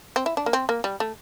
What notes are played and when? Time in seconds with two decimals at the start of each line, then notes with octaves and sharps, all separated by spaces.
0.16 C4
0.26 E4
0.37 D4
0.46 A#3
0.53 C4
0.69 A#3
0.84 G3
1.00 A3